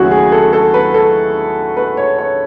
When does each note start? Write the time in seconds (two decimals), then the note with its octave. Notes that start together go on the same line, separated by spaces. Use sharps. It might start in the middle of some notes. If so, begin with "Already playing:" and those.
Already playing: D#2 C#3 F#3 A3 E4 F#4 G#4
0.11 G#4
0.32 A4
0.53 A4
0.74 B4
0.94 A4
1.77 B4
1.97 C#5
2.19 C#5